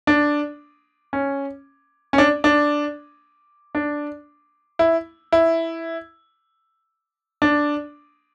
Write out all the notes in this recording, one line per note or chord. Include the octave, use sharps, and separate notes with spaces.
D4
C#4
C#4
D4
D4
D4
E4
E4
D4